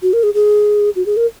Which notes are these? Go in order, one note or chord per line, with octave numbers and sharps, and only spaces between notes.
F#4
A#4
G#4
G#4
F#4
G#4
A#4